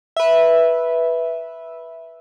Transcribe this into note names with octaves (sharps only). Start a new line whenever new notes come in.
B4 E5